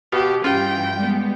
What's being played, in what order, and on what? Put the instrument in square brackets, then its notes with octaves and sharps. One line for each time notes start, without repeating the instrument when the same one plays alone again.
[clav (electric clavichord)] B2 B3 F5 [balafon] F#4 [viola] G4
[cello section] G2 E3 [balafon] C#4 G4 [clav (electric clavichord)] F4 [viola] G5
[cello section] G3 G#3 B3